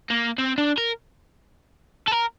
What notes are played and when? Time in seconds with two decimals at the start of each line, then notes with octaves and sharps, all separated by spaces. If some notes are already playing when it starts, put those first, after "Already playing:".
0.10 A#3
0.39 C4
0.58 D4
0.78 A#4
2.08 A4
2.12 A#4